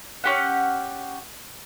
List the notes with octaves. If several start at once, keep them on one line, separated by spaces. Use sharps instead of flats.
C#4 G4 F#5